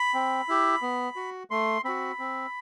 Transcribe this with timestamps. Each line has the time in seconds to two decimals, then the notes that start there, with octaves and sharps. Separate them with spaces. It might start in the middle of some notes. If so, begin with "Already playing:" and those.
Already playing: B5
0.14 C4
0.48 E4 G4
0.82 B3
1.16 F#4
1.51 A3 C6
1.85 C4 F#4 B5
2.19 C4